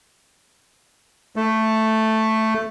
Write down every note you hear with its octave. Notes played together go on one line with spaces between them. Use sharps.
A3